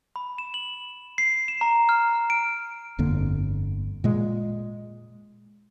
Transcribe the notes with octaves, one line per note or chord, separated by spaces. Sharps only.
B5
E7
F#7
C7
E7
A#5
F6
D7
G1 F2 D3 A#3
A#2 G#3